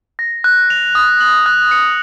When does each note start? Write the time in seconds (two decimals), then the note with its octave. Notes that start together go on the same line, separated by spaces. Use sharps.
0.19 A#6
0.44 F#6
0.70 F7
0.95 D#6
1.21 F#7
1.46 F#6
1.71 C#7